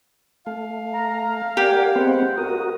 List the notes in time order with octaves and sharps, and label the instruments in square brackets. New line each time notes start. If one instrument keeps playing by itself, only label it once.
[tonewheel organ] A3 [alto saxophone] F5
[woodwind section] A#5
[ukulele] G4 [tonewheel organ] A#4 D5 [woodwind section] F#5 G#5
[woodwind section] G#3 C5 F#5 [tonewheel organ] B3 C4
[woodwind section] C#2 D#6 [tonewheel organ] F#4 A#4